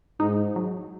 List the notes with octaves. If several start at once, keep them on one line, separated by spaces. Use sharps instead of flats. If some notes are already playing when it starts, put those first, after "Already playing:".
G#2 D#4
F#3